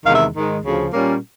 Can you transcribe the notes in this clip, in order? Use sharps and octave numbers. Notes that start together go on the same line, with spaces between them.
E2 C3 D#3 G#3 F5
E5
G#2 D#3 G#3
D2 C#3 F3
A#2 G3 A#3 C#4